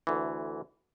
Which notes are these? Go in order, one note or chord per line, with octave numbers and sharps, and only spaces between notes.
D2 E3